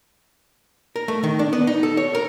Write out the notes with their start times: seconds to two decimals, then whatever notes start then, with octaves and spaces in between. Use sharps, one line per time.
0.96 A#4
1.08 A3
1.24 D#3
1.39 D4
1.53 B3
1.67 D#4
1.83 A4
1.97 C#5
2.15 A#4